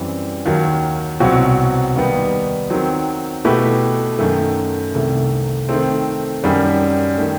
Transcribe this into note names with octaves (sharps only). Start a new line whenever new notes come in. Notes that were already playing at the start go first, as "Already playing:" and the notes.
Already playing: F#2 E3 G3 C4
D#2 D#3 F#3
C2 B2 F#3 C4 F#4
D#2 D#3 G3 B3 D#4
D#3 F#3 C4
B2 A3 E4 G4 B4
F#2 D#3 A3
C2 C3 D#3 A3
D#3 A3 C4
F#2 D#3 G3
D#3 A3